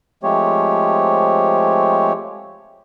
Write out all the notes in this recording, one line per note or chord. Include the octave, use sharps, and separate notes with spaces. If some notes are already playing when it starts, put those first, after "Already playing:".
F3 G#3 A3 C4 G4 C#5